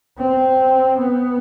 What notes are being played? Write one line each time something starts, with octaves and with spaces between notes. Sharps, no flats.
C4
B3